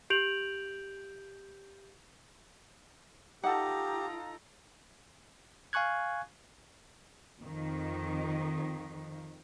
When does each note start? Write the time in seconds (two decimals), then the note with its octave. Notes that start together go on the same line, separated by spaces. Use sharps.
0.10 G4 G6 D7 F7 F#7
3.43 D#4 F4 G4 A4 F#5 A#5
5.73 F5 G#5 C#6 F#6 G#6
7.40 F2 D#3